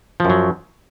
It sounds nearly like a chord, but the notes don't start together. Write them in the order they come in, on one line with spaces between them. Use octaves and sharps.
F3 F#2 F#3